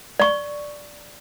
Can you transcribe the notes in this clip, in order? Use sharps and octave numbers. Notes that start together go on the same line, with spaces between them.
D5 C#6